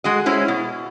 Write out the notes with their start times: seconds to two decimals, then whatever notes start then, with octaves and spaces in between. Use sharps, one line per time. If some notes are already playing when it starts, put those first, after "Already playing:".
0.04 G#3 F#4 D#5
0.26 G#3 C#4 E4 C5
0.48 B2